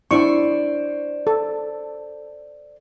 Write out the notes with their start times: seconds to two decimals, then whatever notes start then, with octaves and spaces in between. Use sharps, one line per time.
0.11 D4 E4 C5 D5 C#6
1.27 A4